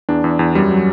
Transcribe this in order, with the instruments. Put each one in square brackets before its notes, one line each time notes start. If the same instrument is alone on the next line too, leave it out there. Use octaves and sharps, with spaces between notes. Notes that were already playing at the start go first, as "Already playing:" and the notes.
[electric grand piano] E2 D4
E2
E2
F#2 G3
F#3